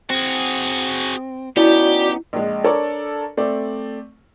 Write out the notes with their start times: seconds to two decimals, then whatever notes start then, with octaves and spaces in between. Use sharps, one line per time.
0.10 C4 F#4 G#4
1.56 B3 C#4 D#4 E4 F#4 G4 D5
2.33 A#1 G#3
2.64 D4 A4 A#4 C#5 D5
3.37 A3 C4 D5